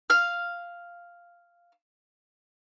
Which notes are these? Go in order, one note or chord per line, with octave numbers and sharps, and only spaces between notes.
F5 F6